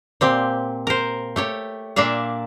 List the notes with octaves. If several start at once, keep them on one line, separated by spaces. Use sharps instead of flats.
A#2 C4 G4
A#4 C5
A3 G4 C#5
A#2 A#3 D4 E5 F5